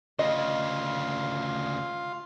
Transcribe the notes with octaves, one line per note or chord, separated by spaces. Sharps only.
D2 C#3 F4 D#5